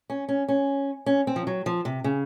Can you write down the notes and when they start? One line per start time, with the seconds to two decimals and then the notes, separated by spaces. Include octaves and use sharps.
0.10 C#4
0.29 C#4
0.48 C#4
1.06 C#4
1.27 C4
1.36 F3
1.47 F#3
1.66 F3
1.85 C3
2.04 C#3